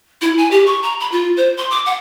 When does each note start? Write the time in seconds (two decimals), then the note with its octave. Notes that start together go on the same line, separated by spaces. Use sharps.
0.22 E4
0.38 G#5
0.51 G4
0.66 C#6
0.83 A#5
1.00 B5
1.12 F4
1.37 C5
1.57 C6
1.70 D6
1.86 F#5